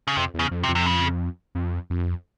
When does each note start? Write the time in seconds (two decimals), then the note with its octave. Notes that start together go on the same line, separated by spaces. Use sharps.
0.08 C#3
0.17 F2 C3
0.34 E2
0.39 C#3
0.51 F2
0.63 C3
0.69 F2
0.75 C3
0.86 C#3
1.55 F2
1.90 F2